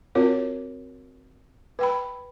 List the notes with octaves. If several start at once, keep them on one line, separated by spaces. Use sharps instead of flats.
C4 F4 F#4 A#4 C#5
B4 G5 B5